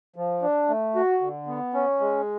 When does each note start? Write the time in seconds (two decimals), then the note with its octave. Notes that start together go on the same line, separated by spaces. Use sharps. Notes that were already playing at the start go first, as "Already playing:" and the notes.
0.16 F3
0.42 D4
0.68 A3
0.95 F#4
1.21 D3
1.47 B3
1.74 C#4
2.00 G#3